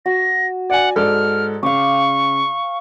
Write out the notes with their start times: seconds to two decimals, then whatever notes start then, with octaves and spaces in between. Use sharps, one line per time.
0.06 F#4 A#6
0.70 D5 F#5 G#5
0.96 G#2 A4 D5 F6
1.63 C#3 F5 C#6 D6